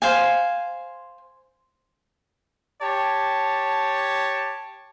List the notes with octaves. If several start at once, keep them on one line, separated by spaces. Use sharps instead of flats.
C5 F5 G#5
G4 C#5 A5